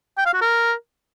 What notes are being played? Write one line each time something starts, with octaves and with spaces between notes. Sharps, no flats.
G5
F5
F#4
A#4